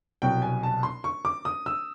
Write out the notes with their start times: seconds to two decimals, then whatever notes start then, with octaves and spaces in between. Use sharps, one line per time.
0.22 C2 B2 F#3 G5
0.42 G#5
0.63 A5
0.83 C6
1.04 C#6
1.25 D6
1.45 D#6
1.66 E6